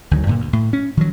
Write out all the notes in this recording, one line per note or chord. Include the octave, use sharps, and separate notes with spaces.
D2 D#3 F#3
G2 A#2 D3
D2
A2
C#4
D#3 F3 F#3